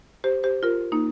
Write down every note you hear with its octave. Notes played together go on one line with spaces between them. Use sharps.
G4 C5
G4 C5
F4 A#4
A#3 D#4